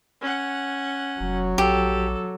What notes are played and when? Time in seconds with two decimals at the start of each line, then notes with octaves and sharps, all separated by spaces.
0.21 C#4 F#5
1.20 F1 F#3
1.58 A#1 G4 A4